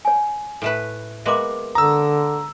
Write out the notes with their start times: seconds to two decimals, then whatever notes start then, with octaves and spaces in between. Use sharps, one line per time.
0.05 C#5 G#5
0.62 A2 A3 B4
1.26 G#3 A#3 B3 E5 C6 D6
1.75 D3 A#5 D#6 E6